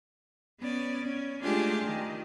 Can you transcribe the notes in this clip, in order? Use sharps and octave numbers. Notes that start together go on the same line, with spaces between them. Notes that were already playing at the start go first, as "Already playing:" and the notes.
B3 C#4 D5
C#4
G#3 A3 D4 F4 G4 G#4
D#3